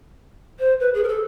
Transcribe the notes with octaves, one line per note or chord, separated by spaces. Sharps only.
C5
B4
G#4
A#4
A4